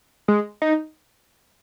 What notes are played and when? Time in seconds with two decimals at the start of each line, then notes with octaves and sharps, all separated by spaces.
0.28 G#3
0.62 D#4